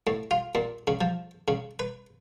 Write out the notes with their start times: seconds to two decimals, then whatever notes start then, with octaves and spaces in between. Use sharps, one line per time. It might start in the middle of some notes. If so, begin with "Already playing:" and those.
0.07 A2
0.31 F4
0.55 A#2
0.87 C#3
1.01 F3
1.48 C#3
1.79 B4